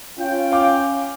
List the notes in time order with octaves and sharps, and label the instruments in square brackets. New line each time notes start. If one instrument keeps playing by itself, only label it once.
[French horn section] C#4 [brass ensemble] F4 G5
[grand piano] F5 D6